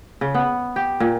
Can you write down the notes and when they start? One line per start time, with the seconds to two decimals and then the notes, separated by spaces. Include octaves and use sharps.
0.21 C#3
0.34 B3
0.76 G4
1.00 A#2